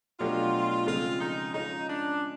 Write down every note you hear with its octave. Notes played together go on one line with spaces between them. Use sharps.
B2 F#3 A3 D4 F4 G4
C#3 F3 G#3 C4 F4
D#4
G#3 C#4 D#4 F4
D4